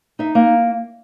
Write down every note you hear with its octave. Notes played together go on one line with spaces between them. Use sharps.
D#4 E5
A#3